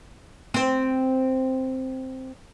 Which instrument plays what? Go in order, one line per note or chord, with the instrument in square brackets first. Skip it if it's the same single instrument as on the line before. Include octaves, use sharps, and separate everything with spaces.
[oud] C4 C5